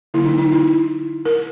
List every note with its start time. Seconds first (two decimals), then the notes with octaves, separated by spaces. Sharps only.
0.14 D3 F#3 A#3 E4
0.26 D#4
0.39 D#4
0.52 E4
1.25 A#4